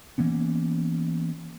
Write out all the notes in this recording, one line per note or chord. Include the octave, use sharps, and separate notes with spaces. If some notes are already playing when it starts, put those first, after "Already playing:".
E3 A#3 B3 C#4